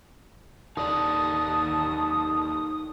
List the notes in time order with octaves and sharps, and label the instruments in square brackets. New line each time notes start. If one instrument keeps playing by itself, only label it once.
[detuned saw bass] D#2 [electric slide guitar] D#4 A4 D5 [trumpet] A5 [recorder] D#6